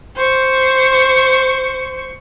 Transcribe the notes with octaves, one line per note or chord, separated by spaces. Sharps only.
C5 C#6